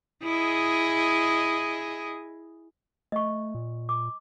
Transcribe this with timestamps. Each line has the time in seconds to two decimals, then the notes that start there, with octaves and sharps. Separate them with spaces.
0.24 E4 G#4 D#5
3.12 A3 D#5 C#6
3.55 A#2
3.89 D6